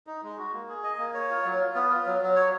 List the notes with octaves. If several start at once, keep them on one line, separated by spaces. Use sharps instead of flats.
D#4
G#3
F#4
A#3
G#4
D#5
A#3
C#5
F4
F#3
F4
B3
F4
F#3
F#3
C#5